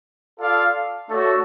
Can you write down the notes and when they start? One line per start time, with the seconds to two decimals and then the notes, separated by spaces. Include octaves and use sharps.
0.39 F4 A4 D5 F5
1.09 A3 D4 F#4 A4 C#5